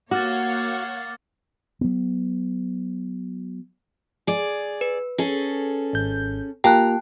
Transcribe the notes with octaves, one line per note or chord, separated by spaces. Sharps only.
A#3 F#4 C#5 F5 F#5 D6 F6 A6
F#3 B3
G#4 D5
B4
C#4 G#4 A4
G#1 G6
A#3 F4 G4 G5 A5 A#5 F#6